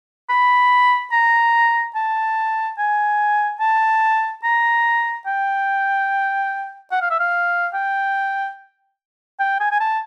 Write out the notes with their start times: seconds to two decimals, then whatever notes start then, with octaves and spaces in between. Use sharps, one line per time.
0.29 B5
1.12 A#5
1.95 A5
2.78 G#5
3.60 A5
4.44 A#5
5.26 G5
6.91 F#5
7.01 F5
7.10 E5
7.19 F5
7.74 G5
9.39 G5
9.60 G#5
9.71 G#5
9.80 A5